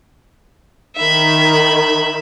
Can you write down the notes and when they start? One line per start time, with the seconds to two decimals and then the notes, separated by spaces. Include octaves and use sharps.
0.96 D#3 E5 B5